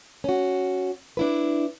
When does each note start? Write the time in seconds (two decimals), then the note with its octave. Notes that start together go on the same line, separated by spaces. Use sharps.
0.24 C#4 F#4
1.17 D4 E4 B4